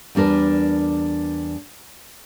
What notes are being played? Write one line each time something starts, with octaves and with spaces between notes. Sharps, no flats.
E2 G3 D4 A#4 B4